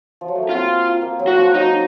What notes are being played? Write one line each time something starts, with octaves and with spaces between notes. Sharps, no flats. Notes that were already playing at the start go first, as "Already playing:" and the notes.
F3
F#3
A3
A#3
C4 F4
A#3
F#3
F#4
F3
F#3 D#4